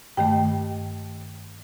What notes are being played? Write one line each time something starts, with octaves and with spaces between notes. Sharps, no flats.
G2 D#3 A3 G5